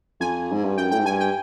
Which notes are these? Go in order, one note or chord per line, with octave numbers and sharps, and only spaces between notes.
F2 G#5
G#2
G2
F#2 G5
A2 G5
G#2
G2 G#5
G5